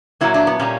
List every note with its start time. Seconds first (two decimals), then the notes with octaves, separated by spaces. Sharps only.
0.21 A#2 F#3 A#3 E4
0.34 D4
0.47 B3
0.59 A#2 G3 A#3 C#4